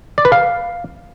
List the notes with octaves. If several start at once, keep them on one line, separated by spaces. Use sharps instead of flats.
D5
B4
F5